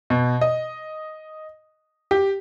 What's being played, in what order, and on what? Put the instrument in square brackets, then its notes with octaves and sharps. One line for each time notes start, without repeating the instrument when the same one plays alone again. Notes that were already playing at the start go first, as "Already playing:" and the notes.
[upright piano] B2
D#5
G4